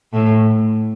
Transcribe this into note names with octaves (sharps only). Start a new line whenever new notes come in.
A2